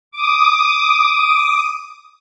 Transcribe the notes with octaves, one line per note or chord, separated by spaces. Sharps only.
D6 D#6